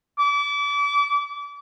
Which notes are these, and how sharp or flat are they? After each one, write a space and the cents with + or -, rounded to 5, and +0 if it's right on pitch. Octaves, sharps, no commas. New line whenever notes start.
D6 -35